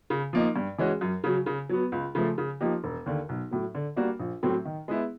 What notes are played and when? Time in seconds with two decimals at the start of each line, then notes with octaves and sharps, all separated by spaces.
0.10 C#3
0.33 F3 A#3 D#4
0.56 G2
0.78 E3 G#3 C#4 F#4
1.01 F#2
1.24 C#3 F#3
1.46 C#3
1.69 F#3 B3
1.92 C#2
2.15 C#3 F3 A3
2.38 C#3
2.61 F3 A#3 D#4 G4
2.84 E1
3.06 D#2 D3
3.29 B1
3.51 A2 F#3
3.75 D3
3.96 G3 A#3 D4 F#4
4.20 A#1
4.43 A2 F#3 A3 C4
4.65 D#3
4.88 G#3 B3 E4